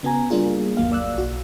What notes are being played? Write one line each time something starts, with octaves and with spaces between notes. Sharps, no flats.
C#3 B3 F#4 G#5 A#5
G3 A#3 D4 F4 G#4
G1 D#2 F#3 A#3 F5
D5 E6 F#6
B1 F#4